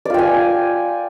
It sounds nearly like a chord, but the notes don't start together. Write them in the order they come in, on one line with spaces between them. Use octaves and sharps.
D5 F4 G5 G#5